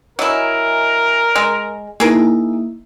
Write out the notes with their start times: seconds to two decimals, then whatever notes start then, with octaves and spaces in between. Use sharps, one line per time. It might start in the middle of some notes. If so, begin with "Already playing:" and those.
0.19 F#3 E4 A#4 D#5 G#5
1.35 G#3
2.00 A#3 D#4 E4 G#4 A#4